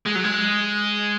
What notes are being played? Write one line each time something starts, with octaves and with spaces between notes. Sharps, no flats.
G#3
F#3
G#3